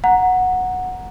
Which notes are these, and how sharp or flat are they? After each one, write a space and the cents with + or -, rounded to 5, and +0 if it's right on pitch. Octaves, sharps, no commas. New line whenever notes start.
F#5 -10 A#5 +0